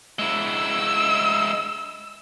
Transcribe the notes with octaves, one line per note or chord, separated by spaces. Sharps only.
G#3 E4 E6